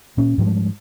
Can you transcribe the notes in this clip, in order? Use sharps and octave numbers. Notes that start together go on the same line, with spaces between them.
A#2 A#3 C#4
G#2 F3 G3 G#3